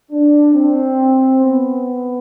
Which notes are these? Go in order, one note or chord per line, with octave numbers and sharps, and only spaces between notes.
D4
C4
B3